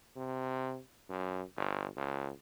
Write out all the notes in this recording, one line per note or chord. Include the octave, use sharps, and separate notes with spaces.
C3
F#2
G1
C#2